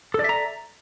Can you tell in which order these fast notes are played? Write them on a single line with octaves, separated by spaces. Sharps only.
A4 D5 E5 A#5